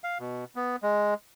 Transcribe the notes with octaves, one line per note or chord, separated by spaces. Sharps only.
F5
B2
B3
G#3